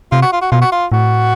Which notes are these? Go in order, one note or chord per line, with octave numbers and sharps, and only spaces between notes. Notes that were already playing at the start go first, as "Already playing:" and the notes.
C3 F4
F#4
F4
F#4
B2 F4
F#4
F4
A2 F#4